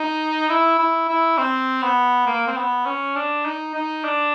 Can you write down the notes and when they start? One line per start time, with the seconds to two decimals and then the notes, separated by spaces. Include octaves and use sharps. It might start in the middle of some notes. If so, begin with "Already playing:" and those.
Already playing: D#4
0.49 E4
0.79 E4
1.09 E4
1.38 C4
1.82 B3
2.27 A#3
2.47 C4
2.57 B3
2.86 C#4
3.16 D4
3.46 D#4
3.75 D#4
4.04 D4